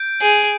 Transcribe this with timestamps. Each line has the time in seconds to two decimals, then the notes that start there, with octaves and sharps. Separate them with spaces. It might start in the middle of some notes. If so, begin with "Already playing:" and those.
Already playing: G6 D7
0.21 G#4